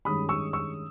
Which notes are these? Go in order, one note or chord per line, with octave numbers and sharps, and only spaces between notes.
G2 D#3 G#3 C#4 B5 D#6
C#6 E6
C#6 E6